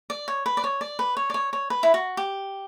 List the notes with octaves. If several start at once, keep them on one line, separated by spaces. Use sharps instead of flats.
D5
C#5
B4
D5
C#5
D5
B4
C#5
D5
C#5
C#5
B4
E4
F#4
G4